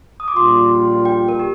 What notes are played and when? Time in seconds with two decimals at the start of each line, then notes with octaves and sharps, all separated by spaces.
0.20 D#6
0.28 D6
0.36 A#1 A#2 G3 A#3 F4 C6
1.05 G5
1.28 A#4
1.39 G4